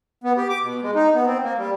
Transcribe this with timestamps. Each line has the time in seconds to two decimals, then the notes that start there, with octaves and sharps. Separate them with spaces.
0.24 B3
0.37 G4
0.49 D6
0.63 B2
0.82 G#3
0.95 D#4
1.14 B3
1.26 C4
1.43 A#3
1.58 G3